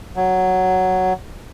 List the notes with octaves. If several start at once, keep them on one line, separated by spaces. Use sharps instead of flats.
F#3